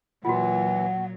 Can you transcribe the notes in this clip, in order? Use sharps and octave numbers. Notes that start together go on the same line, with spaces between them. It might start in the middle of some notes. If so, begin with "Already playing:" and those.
A#2 E3 F#3 F4 F#4 F#5